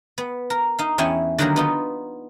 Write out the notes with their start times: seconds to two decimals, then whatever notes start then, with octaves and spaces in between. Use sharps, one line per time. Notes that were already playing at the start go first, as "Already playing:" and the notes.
0.18 B3
0.50 A#4
0.79 D#4 F5
0.98 E2 C#4 E4 G5 G#5
1.38 D3 D#3 F#3 G3 A#3 A#4
1.56 B3 D#4 F4